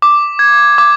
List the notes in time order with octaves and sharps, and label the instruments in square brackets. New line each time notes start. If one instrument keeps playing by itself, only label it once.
[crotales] D6
G#6
D6